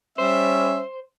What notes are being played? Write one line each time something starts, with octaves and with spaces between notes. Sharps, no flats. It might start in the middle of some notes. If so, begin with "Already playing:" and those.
G3 C#4 C5 E5